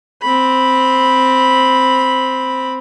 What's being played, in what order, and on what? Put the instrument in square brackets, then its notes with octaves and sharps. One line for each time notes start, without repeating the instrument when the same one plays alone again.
[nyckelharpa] C4 B5